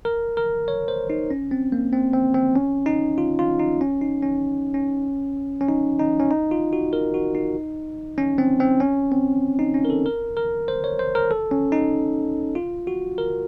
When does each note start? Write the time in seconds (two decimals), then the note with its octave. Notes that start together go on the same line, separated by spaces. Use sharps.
0.05 A#4
0.37 A#4
0.68 C#5
0.88 C5
1.10 D#4
1.31 C#4
1.51 C4
1.72 A#3
1.93 C4
2.13 C4
2.34 C4
2.56 C#4
2.86 D#4
3.18 F4
3.39 F4
3.60 D#4
3.81 C#4
4.01 D#4
4.22 C#4
4.74 C#4
5.61 C#4
5.68 D#4
5.99 D#4
6.20 C#4
6.31 D#4
6.51 F4
6.73 F#4
6.93 A#4
7.14 F#4
7.35 D#4
8.18 C#4
8.38 C4
8.60 C4
8.80 C#4
9.12 C4
9.59 D#4
9.74 C#4
9.85 A#4
9.90 A4
10.06 A#4
10.37 A#4
10.68 C5
10.84 C#5
10.99 C5
11.15 A#4
11.31 A4
11.51 C#4
11.72 D#4
12.55 F4
12.87 F#4
13.18 A#4